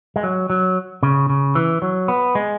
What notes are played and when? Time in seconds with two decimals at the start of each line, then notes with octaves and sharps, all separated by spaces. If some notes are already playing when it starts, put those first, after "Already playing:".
0.16 G#3
0.23 F#3
0.50 F#3
1.03 C#3
1.29 C#3
1.55 E3
1.82 F#3
2.08 B3
2.35 G#3